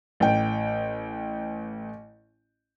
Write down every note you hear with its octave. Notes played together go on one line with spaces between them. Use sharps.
A1 G5